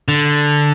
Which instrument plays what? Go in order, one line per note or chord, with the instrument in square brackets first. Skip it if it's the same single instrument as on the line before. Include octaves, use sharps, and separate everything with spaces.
[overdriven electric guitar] D3